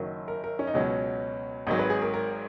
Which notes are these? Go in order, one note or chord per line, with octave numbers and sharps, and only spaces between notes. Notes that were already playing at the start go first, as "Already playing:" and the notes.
Already playing: F#1 F#2 D#3 F#3
A#4
A#4
C#4
D#4
C#2 B2 F#3 C#4
G#1 G#2 F#3 D#4
B4
G#4
A#4
A#4